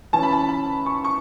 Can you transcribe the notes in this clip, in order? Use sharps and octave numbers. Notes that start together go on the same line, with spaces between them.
E3 C#4 A5
B5
A5
B5
C#6
C#6